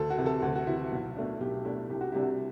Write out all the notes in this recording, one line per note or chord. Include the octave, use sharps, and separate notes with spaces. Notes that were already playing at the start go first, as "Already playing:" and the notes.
Already playing: D2 A4
F#4
C3 E3
A4
D2 F#4
F#4
C3 E3 E4
B1
B2 A3 D4
B1 G4
B2 A3 D4 E4
C2 G4
F#4
C3 G3 D4 E4
F#4